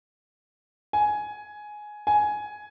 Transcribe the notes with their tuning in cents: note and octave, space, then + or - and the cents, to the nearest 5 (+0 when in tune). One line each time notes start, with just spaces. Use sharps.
G#5 +10
G#5 +10